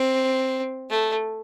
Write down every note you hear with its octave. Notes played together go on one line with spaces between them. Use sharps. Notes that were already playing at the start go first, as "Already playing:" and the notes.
Already playing: C4
A3